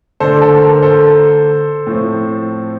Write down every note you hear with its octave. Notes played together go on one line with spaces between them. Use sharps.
D3 A3 D4 A4 C5
A4 C5
A#4
A4 C5
A2 F3 C4